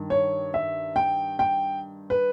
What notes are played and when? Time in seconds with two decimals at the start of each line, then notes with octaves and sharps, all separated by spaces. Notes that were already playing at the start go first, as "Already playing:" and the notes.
Already playing: G2 D#3
0.10 C#5
0.54 E5
0.96 G5
1.39 G5
2.10 B4